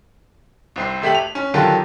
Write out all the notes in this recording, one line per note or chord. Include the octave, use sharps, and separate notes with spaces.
C2 C4 C7
G#1 A3 G4 B6 F#7
F7
C#4
D3 D#3 F#3 F4 G4 A4